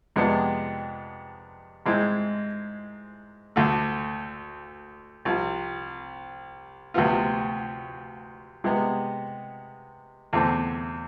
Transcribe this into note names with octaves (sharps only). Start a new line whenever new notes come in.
F2 C3 G#3 B3 D4
G#2 G#3 C4 E4
D2 D3 A3
C2 C3 F3
D2 C3 F3 B3 F4
C3 G#3 B3
E2 D3 A3 C4